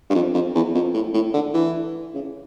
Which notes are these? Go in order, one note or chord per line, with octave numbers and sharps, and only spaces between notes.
G2
F2
F2
E2
F2
A2
A2
D3
E3
C#3